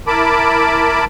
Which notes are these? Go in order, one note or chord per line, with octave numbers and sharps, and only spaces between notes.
E4 A#4 A5 B5 D6